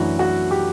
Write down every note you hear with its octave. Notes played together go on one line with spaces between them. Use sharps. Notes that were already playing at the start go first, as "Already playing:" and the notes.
Already playing: F#2 E3 A3 D4 E4 F#4
F#4
G4